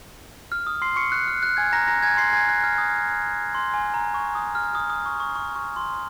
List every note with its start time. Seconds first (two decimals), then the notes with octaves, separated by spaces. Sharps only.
0.52 F6
0.67 D#6
0.82 C6 C7
0.96 C#6 C#7
1.12 F#6
1.27 F6
1.42 F#6
1.57 G#5 G#6
1.73 A#5 A#6
1.88 A#5 A#6
2.03 G#5 G#6
2.17 C6 C7
2.33 G#5 G#6
2.49 F#6
2.63 F6
2.78 D#6
3.55 C6
3.74 G#5
3.94 A#5
4.14 C#6
4.35 D#6
4.55 F6
4.75 D#6
4.90 D#6
5.06 C#6
5.20 C#6
5.36 C#6
5.56 C#6
5.76 C6